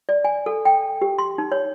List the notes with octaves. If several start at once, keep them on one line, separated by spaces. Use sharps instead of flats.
D5
G#5
A4
G5
G4
C6
D#4
C#5